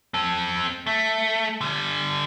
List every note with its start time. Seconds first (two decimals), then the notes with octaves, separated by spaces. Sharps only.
0.14 C4 A4
0.87 A3
1.61 D3 G3